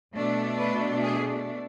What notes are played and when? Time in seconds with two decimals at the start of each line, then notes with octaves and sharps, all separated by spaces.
0.14 B2 A3 D4
0.58 B4
1.03 G#4